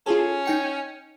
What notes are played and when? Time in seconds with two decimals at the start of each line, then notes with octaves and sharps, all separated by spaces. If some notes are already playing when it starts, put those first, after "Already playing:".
0.06 C#4 F4 G#4 A4
0.45 D#4 G5 C#7